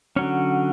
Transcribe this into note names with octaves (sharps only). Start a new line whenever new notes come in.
D3 F#3 C#4 C#5